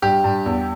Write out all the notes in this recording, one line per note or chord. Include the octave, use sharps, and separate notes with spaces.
G2 G4
G2
E2